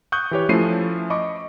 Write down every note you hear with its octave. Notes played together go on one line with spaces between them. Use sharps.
C#6 D#6 F#6 G6
E3 G4 C#5
F3 A3 C#4 E4 C7 D#7
D#5 B5 C#6 D6